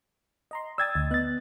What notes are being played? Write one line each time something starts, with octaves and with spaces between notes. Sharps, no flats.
D#5 A#5 C6
D5 G5 D#6 E6 G#6 A6
D2 D#5
B3 D#5 F#6 A6